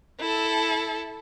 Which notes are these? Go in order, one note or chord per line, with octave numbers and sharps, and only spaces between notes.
E4 A4